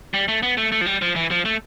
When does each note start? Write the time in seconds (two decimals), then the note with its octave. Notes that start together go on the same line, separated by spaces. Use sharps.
0.14 G3
0.28 A3
0.43 B3
0.58 A3
0.72 A3
0.81 F3
0.86 G3
1.02 F3
1.16 E3
1.31 F3
1.45 A3